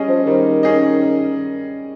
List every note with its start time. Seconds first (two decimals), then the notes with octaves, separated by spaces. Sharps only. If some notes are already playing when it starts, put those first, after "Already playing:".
Already playing: G3 C#4 G#4 D#5
0.08 F3
0.27 D#3 G3
0.63 C#4 G#4 D#5